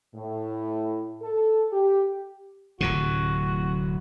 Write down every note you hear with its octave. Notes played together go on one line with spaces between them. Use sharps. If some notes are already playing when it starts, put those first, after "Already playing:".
A2
A4
G4
D1 A2 C3 F#4